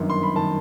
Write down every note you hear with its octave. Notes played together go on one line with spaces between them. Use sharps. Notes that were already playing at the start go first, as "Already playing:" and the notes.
Already playing: G1 F#2 D#3
C6
B5
D#3 A5